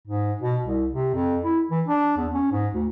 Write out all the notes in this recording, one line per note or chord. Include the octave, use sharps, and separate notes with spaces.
G#2
B2
C2
C3
F2
E4
E3
D4
E2
C#4
G#2
D2